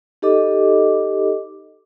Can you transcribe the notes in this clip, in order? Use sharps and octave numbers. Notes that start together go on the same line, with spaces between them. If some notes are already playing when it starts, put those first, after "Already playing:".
D#4 G4 A4 D#5 D6